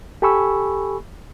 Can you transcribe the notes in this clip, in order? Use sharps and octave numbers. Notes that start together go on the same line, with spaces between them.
G4 A4 G#5 B5 C#6 E6